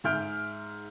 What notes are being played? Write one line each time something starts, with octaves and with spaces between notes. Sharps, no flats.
G#2 G#4 E5 F6 G6 D7